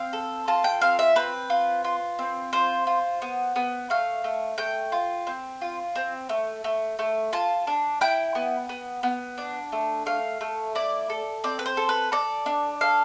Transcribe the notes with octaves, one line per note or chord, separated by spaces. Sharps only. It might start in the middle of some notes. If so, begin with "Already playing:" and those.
Already playing: C4 F5
A4
F4 A5
G5
C4 F5
E5
C4 B4
F4
F4
C4
F4 C5
F4
B3
B3
A3 F5
A3
A3 G5
F4
C4
F4
C4
A3
A3
A3
F4 A5
D4
E4 G5
B3
B3
B3
D4
A3
A3 F5
A3
E4 D5
A4
C4 D5
B4
C5
A4
B4
A4 D5
D4
A4 F5